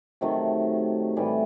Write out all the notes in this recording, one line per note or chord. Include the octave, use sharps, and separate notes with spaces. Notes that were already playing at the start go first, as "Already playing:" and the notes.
C3 D#3 F#3 A3
A2 E3 G3